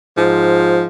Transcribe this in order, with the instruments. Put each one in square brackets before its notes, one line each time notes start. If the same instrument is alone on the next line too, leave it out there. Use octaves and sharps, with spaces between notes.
[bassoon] G#2 [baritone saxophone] F3